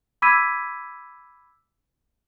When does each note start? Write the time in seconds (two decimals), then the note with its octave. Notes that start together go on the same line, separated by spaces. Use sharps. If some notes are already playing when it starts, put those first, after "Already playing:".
0.22 B5 D6 E6 G#6 B6 D#7